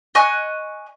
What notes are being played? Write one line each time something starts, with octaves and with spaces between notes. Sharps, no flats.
D#5 G#5 C#6 F#6